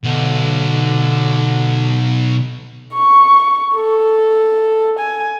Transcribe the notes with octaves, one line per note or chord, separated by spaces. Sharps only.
B1 D3
C#6
A4
G#5